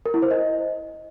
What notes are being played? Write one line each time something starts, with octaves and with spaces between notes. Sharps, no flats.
A#4
E4
C5
D#5